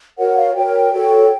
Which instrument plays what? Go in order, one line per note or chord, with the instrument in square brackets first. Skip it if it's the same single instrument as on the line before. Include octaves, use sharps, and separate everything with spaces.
[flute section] F#4 A#4 C#5 F#5
F5
F#4 A#4 C#5 G5
F#4 A4 C#5